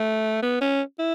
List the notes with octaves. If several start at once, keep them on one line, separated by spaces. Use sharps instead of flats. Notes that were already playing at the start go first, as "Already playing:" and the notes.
Already playing: A3
B3
C#4
E4